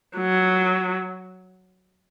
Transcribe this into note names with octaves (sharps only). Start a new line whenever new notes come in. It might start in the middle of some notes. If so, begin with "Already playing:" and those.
F#3